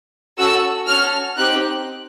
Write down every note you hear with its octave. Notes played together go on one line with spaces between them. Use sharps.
C#4 F#4 A4 E6
C#4 F#4 A4 F6
C4 D#4 G4 F#6